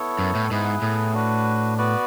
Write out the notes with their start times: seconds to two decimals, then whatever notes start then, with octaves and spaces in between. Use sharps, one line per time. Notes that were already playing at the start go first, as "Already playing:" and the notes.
Already playing: B3 E4 A4 C#5
0.19 F#2
0.35 A2
0.50 G#2 B3 E4 G#4 B4
0.82 A2
1.14 D4 F#4 B4
1.78 B3 F#4 B4 D5